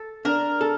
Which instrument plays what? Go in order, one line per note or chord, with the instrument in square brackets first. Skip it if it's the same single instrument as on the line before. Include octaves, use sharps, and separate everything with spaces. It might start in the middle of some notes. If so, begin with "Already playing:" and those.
Already playing: [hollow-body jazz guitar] A4
[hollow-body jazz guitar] D4 [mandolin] A#4
[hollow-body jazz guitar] A4